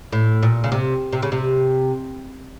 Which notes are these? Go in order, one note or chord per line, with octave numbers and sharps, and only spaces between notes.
A2
A#2
C#3
C3
C3
C#3
C3